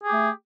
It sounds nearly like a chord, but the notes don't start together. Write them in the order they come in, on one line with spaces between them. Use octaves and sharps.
G#4 G4 A3